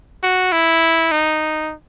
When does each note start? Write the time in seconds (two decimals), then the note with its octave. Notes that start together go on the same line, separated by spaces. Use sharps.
0.23 F#4
0.52 E4
1.11 D#4